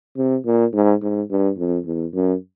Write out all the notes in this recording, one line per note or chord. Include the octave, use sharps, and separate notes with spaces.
C3
A#2
G#2
G#2
G2
F2
E2
F#2